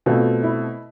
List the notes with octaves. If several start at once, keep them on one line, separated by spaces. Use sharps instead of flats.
B2 A3 C4 F4
E4